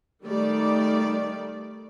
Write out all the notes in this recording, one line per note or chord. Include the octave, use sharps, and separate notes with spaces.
D#3 G3 A3 D5